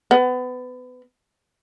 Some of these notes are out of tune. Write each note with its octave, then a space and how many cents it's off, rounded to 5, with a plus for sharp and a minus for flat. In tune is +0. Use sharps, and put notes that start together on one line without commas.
B3 +30